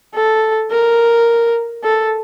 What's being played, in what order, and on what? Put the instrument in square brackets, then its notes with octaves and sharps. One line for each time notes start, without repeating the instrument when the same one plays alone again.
[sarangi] A4
A#4
A4